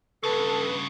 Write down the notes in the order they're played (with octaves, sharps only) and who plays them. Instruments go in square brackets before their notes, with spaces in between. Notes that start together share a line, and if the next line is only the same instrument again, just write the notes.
[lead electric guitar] G2 C#3 [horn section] A4 [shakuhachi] B4